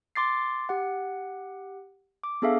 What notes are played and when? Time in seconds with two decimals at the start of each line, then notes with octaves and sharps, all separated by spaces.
0.16 C6 D6 A6 C7
0.69 G4 F#5
2.23 D6
2.42 B3 D4 G#4 A4 E5 F5